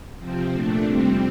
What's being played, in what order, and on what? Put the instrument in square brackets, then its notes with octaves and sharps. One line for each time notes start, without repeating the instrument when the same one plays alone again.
[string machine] C3 F3 C4
A#2 A3 D4
F2 C3 G3 C4